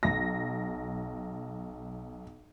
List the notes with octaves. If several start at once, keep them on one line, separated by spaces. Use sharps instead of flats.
B1 A#6